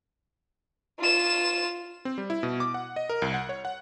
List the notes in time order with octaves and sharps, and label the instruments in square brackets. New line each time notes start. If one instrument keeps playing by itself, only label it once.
[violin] F4 E7
[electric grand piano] C4
G3
E4
B2
D6
F#5
D#5
A#4
C2
F#5
C#5
F#5